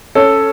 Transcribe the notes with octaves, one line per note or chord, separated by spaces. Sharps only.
C#4 A4